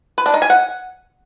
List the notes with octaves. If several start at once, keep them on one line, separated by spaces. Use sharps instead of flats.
B4
D4
D#4
G#5
F#5